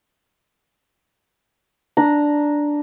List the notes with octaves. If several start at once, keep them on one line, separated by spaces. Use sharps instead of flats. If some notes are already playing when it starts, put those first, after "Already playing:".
D4 A#5